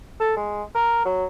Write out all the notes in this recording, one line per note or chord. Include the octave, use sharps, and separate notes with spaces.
A4
G#3
A#4
F#3